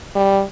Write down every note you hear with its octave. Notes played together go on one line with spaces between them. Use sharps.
G3